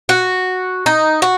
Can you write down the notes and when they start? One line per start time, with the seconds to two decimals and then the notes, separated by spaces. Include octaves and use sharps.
0.09 F#4
0.86 D#4
1.22 F#4